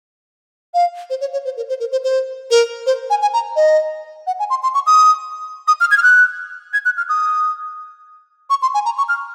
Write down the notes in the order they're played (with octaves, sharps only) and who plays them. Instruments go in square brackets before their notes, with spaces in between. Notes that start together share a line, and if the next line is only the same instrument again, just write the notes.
[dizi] F5
C5
C#5
C#5
C5
A#4
C5
A#4
C5
C5
A#4
C5
G#5
G#5
A#5
D#5
F#5
G#5
C6
C6
C#6
D#6
D#6
F6
G#6
F6
F#6
G#6
F#6
F6
D#6
C#6
C6
G#5
A#5
C#6
F6